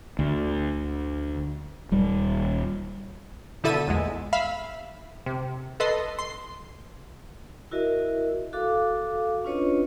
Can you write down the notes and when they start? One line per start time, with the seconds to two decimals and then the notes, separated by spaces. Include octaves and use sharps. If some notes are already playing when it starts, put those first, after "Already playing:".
0.19 D2
1.91 D#1 G3
3.64 B2 D3 E4 A4 E5 D#7
3.87 A#1 E2 G#3
4.33 E5 F5 B5
5.26 C3
5.80 A4 B4 D#5 C6
6.19 C6
7.71 E4 F#4 A#4 D#5 E5
8.53 F#4 A4 F5 D6
9.44 C#4 D4 F4 B4 C#5 D#5